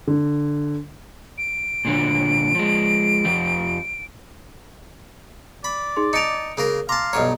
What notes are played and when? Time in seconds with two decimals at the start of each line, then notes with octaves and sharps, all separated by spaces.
0.07 D3
1.38 D7
1.85 A#2 D3 F#3
2.55 F3 G#3
3.25 F2 F3 G4
5.64 D5 B5
5.96 D#4 G#4 C6
6.13 D#4 A5 C#7 D7 F7
6.57 C#3 A#3 A#4
6.89 F5 A5 A#5 C6 D6
7.13 B1 G2 C#5 D#5 A#5